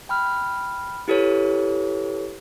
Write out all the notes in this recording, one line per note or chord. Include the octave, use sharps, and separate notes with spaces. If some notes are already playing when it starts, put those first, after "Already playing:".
G5 B5 F6
E4 G4 A4 B4 C#5